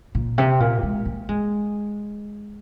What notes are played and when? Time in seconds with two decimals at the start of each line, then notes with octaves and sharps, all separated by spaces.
0.15 A#2
0.38 C3
0.60 A#2
0.83 G#3
1.05 A#3
1.29 G#3